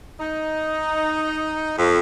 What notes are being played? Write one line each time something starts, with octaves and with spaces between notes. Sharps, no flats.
D#4
F2